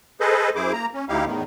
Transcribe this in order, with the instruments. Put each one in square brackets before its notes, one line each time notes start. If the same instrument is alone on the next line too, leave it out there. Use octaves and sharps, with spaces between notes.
[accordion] G#4 A4 B4 C5 D#5
F#2 E4 G#4 C5 D6
A#3 A#5
C#4
D2 D#4 E4 G4 F5
E2 A2 D#3